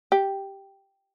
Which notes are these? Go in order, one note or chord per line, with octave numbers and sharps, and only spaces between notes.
G4